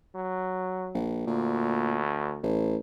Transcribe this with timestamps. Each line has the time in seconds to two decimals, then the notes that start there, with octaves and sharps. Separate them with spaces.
0.15 F#3
0.94 A#1
1.27 D2 A#2
2.43 A1